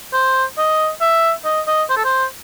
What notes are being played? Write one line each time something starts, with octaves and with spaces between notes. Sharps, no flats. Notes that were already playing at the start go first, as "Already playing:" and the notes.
C5
D#5
E5
D#5
D#5
C5
A4
C5